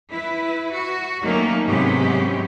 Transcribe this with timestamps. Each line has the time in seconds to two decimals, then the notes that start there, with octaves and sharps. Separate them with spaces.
0.11 E4 B4
0.71 F#4
1.22 D#3 F#3 A3 A#3 C#4
1.65 G#2 C3 F#3 B3 C#4 G4